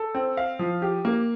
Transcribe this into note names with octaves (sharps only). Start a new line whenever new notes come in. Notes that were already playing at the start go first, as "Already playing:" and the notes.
Already playing: A4
C4
F5
F3
G4
A#3